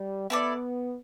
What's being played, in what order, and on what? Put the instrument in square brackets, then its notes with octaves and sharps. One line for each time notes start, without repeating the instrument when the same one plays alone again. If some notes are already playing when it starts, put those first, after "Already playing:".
Already playing: [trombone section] G3
[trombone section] B3 [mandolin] E4 A4 D5